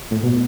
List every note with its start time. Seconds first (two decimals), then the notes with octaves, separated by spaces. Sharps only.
0.11 A2
0.23 B2